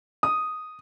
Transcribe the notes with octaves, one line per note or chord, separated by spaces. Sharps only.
D#6